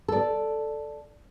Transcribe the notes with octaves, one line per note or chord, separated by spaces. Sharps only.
A4 D5